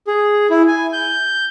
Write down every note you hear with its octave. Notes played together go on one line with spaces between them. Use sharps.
G#4
E4
G#5
G6